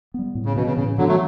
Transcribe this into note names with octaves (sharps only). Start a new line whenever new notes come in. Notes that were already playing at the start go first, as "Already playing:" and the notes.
G3 B3
A2
C#3
B2 E3 B3
C#3
A2 C#3
D3 E3 F#3 B3
F#3 A3